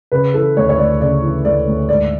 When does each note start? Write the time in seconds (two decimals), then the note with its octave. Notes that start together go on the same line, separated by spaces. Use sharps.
0.12 C#3 B4
0.34 E3 A4
0.56 D2 C#5
0.69 C#5
0.78 D2 D5
1.01 C#3 D5
1.22 E3
1.45 D2 D5
1.67 D2
1.89 G#2 D5